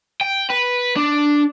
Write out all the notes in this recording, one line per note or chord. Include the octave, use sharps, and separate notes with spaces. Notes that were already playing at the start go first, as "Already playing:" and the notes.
G5
B4
D4